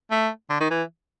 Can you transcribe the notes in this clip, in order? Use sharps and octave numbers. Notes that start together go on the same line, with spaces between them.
A3
D3
D#3
E3